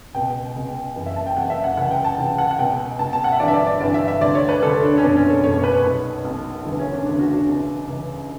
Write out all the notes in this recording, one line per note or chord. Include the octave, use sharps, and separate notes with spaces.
C#2 B2 G5
C#2 B2
F#1 F#2 E3
E5
A5
G5
F#1 F#2 E3 F#5
E5
F#5
C#2 C#3 E3 F#5
G5
A5
C#2 C#3 E3 G5
F#5
F#5
C#2 B2 G5
C#2 B2 A5
A5
F#5
E5
G1 G2 E3 D5
E5
D5
D5
G1 G2 E3 D5
E5
E5
D2 D3 D5
C#5
B4
D2 D3 A4
D4
C#4
F#1 E2 B2 D4
C#4
A4
F#1 E2 B2 C#5
B4
B1 B2
B1 B2
E1 D2 C#3 E3
C#4
D4
E1 D2 C#3 E3 D4
F#4
D4
C#2 C#3 E3
C#2 C#3 E3